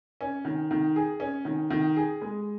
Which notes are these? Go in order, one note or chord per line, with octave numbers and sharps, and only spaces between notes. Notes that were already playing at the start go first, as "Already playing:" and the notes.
C#4
D#3
D#3
G#4
C#4
D#3
D#3
G#4
G#3